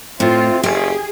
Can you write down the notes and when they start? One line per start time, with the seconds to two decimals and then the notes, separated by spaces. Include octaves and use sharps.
0.20 A2 C4 F4
0.63 F#1 G4 G#4